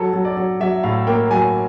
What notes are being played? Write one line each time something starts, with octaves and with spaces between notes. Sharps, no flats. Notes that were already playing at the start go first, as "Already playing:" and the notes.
Already playing: F#3 A4
F#3
D5
F#3
F#3 E5
A2 F5
A#3 G5
F#3 G#5